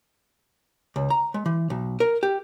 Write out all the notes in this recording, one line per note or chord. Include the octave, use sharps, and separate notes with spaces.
C#2
A#5
G#3
E3
B1
A#4
G4